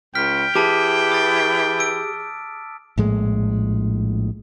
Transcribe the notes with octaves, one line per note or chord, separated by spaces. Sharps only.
C#2 G5 F6 B6
E3 G4 G#4 A5 D6
D#6 A6
E6 D7
A#1 A2 G#3